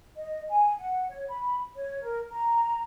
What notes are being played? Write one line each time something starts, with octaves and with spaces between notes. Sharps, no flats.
D#5
G#5
F#5
C#5
B5
C#5
A#4
A#5